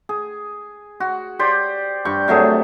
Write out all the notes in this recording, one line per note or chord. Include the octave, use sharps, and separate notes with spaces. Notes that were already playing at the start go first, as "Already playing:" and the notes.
G#4
F#4
G4 C5 D5
G2 G5 C#6
C3 F#3 A3 G#4